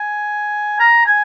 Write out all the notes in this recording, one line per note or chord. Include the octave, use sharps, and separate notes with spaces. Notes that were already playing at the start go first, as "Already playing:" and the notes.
Already playing: G#5
A#5
G#5